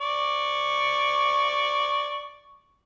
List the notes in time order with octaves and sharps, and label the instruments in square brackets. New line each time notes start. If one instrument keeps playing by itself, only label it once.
[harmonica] D5 C#6